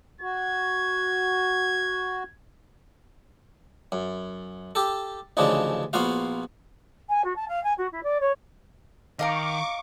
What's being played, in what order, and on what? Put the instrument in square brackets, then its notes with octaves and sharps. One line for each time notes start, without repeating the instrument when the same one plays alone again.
[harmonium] F#4 [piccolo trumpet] G#6
[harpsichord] F#2
G4 A4
A1 D2 C#3 F3 D4 D#4
A#1 A#3 B3 F4 F#4 F5
[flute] G#5
F#4
A5
F5
G#5
F#4
E4
D5
C#5
[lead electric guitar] D#3 [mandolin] D#5 F5 A#5 [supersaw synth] C#6 D6